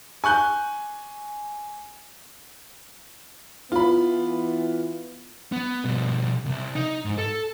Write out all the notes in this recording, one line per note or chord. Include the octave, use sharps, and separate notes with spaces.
G#5 C#6 F#6 G6
E3 B3 F4 B5
B3
B2 G3
C2
D#4
G#2
A4